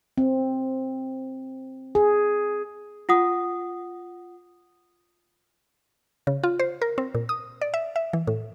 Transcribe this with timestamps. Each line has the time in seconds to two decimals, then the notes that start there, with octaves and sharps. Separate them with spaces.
0.18 C4
1.95 G#4
3.09 F4 F#5 D#6
6.27 C#3
6.43 F4
6.59 C5
6.82 A#4
6.98 C4
7.15 A#2
7.29 D#6
7.61 D5
7.74 E5
7.96 E5
8.13 E3
8.27 A2